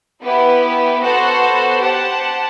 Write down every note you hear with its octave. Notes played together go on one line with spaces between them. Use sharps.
B3 E4 G4 B4
B3 F#4 A4 C5 F#5
G4 C5 F#5 A5